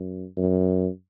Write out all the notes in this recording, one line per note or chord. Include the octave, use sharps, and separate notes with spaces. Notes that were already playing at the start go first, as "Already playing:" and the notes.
Already playing: F#2
F#2